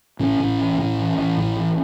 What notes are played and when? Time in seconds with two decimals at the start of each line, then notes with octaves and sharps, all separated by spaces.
0.19 A2 C#4
0.40 A2
0.58 A1
0.78 A2
0.99 A1
1.17 A1
1.37 A2
1.56 A1